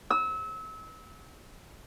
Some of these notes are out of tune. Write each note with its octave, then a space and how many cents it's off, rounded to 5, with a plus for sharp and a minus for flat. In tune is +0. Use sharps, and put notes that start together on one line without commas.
E6 -30